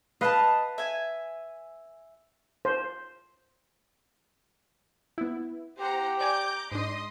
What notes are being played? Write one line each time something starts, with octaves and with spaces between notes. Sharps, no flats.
B4 D#5 F5 F#5 A5
E5 G#5
C5
B3 E4
G4 C5 F#5 A#5
D5 G#5 A#5 D6 G6
G#2 D4 D#5 C6 D#6